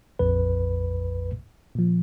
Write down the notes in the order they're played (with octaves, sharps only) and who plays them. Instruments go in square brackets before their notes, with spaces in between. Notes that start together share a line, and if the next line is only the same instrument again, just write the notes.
[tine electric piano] A#1 F2 B4
[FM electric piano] A#2 F3